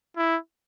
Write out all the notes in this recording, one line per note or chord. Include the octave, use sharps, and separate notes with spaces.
E4